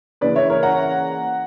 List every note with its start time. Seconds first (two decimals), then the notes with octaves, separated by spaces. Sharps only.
0.21 C#3 E3 A#3 C#4 B4 D5
0.35 C#5 E5
0.50 A#4 C#5
0.63 F#5 A#5